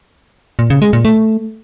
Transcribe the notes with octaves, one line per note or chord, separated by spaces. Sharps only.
A#2
C#3
G#3
A#2
A3